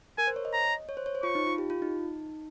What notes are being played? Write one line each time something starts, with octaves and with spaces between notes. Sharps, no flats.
A#4 G#5
C5
C#5
D#5
A#5
C#5
C5
C#5
C5
F4 C#6
D#4
F4
G4
F4
D#4